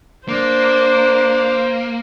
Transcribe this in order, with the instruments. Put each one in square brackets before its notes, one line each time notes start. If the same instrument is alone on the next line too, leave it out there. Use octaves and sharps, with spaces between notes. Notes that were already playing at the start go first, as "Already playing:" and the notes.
[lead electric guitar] A#3 [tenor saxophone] D4 [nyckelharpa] C5